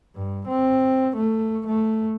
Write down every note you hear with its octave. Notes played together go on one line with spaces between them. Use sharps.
G2
C4
A3
A3